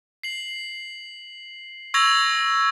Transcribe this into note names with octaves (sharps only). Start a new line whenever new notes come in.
C7 F#7
C#6 E6 G#6 A#6 F7 F#7